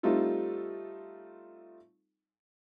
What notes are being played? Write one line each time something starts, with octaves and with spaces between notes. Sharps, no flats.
G3 A3 C4 D#4 F4 A4